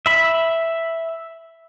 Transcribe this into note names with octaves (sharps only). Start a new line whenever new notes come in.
E5 B5